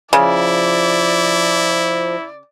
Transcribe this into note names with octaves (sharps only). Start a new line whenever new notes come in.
C#3 F3 E4 D5